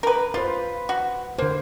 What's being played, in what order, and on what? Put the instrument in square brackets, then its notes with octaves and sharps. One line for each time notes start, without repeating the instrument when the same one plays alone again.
[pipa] A#4 B4
[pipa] F4 [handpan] B4 C5
[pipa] F#4
[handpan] D3 C5 [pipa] A#3